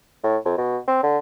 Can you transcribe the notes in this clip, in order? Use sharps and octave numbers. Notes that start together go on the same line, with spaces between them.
A2
F2
B2
C4
D3